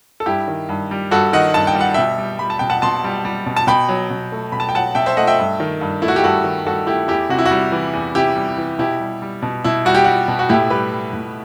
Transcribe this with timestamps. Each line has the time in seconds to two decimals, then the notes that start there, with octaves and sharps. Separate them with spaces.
0.20 A4
0.26 G2 E4 G4
0.48 D#3
0.69 G2
0.91 G3
1.11 G2 F#4 A4
1.33 D#3 D#5 F#5
1.54 G2 A5
1.67 G5
1.75 G3
1.81 F#5
1.94 B2 E5 G5
2.18 G3
2.39 G3 B5
2.50 A5
2.59 B2 G5
2.70 F#5 A5
2.82 B2 A5 C6
3.04 G3
3.25 G3
3.46 B2
3.57 A5
3.67 B2 G5 B5
3.88 F#3
4.10 B2
4.32 A3
4.52 B2 B5
4.60 A5
4.69 G5
4.75 F#3 F#5 A5
4.95 B2 E5 G5
5.06 C5 E5
5.17 A3 D#5 F#5
5.27 E5 G5
5.39 G2
5.60 D#3
5.81 G2
6.02 A3 E4
6.08 F#4
6.16 G4
6.23 G2 F#4 A4
6.44 D#3
6.65 G2 F#4 A4
6.87 A3 E4 G4
7.08 E2 E4 G4
7.29 C3 F#4
7.39 E4
7.46 F#4
7.51 G3
7.72 E3
7.93 E2
8.15 C3 E4 G4
8.36 G3
8.58 E3
8.79 B2 E4 G4
9.00 G3
9.22 G3
9.42 B2
9.64 B2 E4
9.85 G3 F#4
9.95 G4
10.04 G3 F#4
10.28 B2
10.39 F#4
10.49 A2 E4 G4
10.70 G3 G4 B4
10.92 G3
11.13 A2